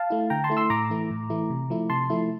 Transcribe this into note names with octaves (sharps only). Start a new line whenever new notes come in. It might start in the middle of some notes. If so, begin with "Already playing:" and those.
Already playing: F5 A5
A3 E4
D3 G5 A#5
A5 C6
A3 E4
C6 E6
A2 A#5 D6
E3 A3 E4
A2
E3 A3 E4
C3
F3 A3 E4
C3 A5 C6
F3 A3 E4